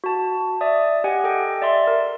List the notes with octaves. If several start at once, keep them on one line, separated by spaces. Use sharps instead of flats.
F#4 A5
D5 E5 D#6
G4 D#5 F#5 G#5
A4 D#5 G5
D5 E5 C6
A#4